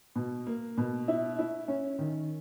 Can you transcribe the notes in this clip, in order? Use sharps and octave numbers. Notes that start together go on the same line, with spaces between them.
B2
A#3
B2
E4
E4
C#4
D#3